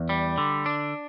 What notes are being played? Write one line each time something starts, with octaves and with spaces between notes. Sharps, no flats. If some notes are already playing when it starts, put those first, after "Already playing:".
Already playing: E2
G3
D3
D4